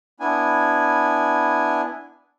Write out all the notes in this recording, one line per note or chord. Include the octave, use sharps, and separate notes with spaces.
B3 D4 E4 G#5